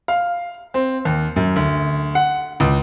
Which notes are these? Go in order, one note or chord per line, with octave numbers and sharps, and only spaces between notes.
F5
C4
D#2
F#2
D2
F#5
C#2